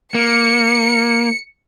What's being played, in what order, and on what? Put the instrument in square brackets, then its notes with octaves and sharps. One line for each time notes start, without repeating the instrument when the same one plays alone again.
[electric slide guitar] A#3 [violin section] C#7